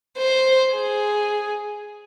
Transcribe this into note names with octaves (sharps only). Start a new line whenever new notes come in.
C5
G#4